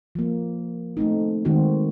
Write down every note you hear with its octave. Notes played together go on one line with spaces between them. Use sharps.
F3 A#3
A3 C4 D#4
D#3 G#3 C4 F#4